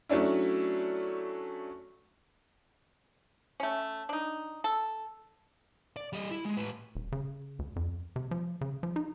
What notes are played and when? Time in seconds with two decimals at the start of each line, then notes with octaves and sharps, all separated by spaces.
0.09 F#3 A3 C#4 D4 E4
3.60 A3 C#4
4.09 D4 D#4
4.64 A4
5.96 D5
6.13 G3 D#5
6.31 E4
6.45 G#3
6.57 A2 B4
6.95 D#1
7.12 C#3
7.59 D2
7.76 F2
8.16 C3
8.31 F3
8.61 C#3
8.83 F3
8.96 D#4